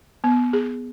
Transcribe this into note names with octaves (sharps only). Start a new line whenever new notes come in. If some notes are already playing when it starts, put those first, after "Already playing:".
B3
G#4